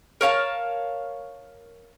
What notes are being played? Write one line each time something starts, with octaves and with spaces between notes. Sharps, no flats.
A#4 C#5 F5 A5